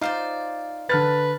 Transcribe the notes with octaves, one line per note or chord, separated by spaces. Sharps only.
D#4 F4 C5 D5 F5
D3 B4 F6 A6